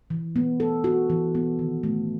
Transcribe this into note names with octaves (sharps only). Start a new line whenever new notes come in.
E3
B3
A4
F#4
E3
B3
D#3
A3